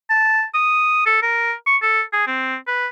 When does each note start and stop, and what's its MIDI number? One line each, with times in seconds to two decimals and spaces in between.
0.10 0.44 81
0.54 1.02 87
1.06 1.19 69
1.23 1.53 70
1.66 1.77 85
1.82 2.01 69
2.13 2.26 68
2.27 2.56 60
2.67 2.87 71